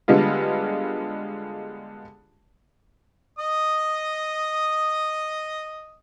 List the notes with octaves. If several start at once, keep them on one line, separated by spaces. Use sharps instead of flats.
D3 G3 G#3 B3 F4
D#5 D#6